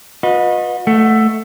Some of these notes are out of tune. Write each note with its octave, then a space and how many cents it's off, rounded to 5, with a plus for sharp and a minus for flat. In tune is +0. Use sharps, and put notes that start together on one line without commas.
F#4 -45 B4 -15 D#5 +0
A3 +0 F#5 +0